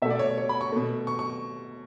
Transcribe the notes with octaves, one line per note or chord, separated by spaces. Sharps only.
B2 A3 D5 E5
C#5
C#5
B5
C#6
B2 A3
C#6
C#6